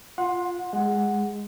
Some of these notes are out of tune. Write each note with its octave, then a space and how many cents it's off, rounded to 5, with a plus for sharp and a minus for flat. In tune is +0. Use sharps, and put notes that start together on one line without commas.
F4 +0 F#5 -25 C6 +10
G#3 -10 F#5 +0